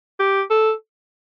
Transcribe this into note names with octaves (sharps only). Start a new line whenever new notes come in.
G4
A4